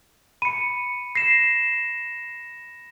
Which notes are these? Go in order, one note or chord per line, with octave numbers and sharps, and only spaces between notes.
B5 C#7 D#7
A#6 C7 E7